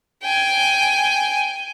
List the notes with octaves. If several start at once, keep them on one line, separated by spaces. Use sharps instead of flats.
G5 G#5